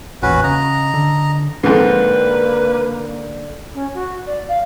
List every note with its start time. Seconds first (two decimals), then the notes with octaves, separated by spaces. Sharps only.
0.22 A1 E2 A#2 C#4 F#4 B4
0.44 C#3 D#5 A#5
0.94 D3
1.63 F2 G#2 D3 A#3 D#4 B4
3.74 C#4
3.94 F#4
4.26 D5
4.48 F5